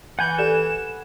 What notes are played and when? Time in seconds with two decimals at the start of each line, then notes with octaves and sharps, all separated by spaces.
0.19 E3 F#5 G#5 B5 G6
0.38 G4 A4 D5 E7